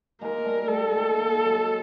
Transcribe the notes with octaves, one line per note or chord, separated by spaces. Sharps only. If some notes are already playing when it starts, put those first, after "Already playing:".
G#3 A#3 A#4
G3 A3
G3 A3 A4
G#3 A#3
G#3 A#3
F#3 G#3